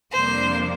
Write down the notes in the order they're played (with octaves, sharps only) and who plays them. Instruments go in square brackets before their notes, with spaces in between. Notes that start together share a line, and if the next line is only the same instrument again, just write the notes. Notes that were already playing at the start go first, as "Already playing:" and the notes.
[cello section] F2 C3 G3 A#3 D4 [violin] C5